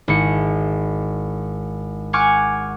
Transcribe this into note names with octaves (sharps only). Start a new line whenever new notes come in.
G#1 E4 C#7
F#5 G#5 C#6 D6 F6